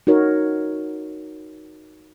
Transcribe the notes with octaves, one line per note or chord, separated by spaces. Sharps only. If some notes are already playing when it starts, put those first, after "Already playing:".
D#4 F#4 A#4 C#5